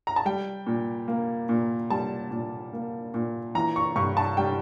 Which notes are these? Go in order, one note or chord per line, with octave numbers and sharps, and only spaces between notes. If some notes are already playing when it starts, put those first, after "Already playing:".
A#5
A5
G3 G5
A#2
A#3
A#2
G3 A5
A#2
A#3
A#2
E3 A#5
C#6
G2 C#6
A5
G3 G5